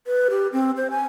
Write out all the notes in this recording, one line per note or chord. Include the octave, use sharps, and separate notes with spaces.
B4
G4
C4
C5
G#5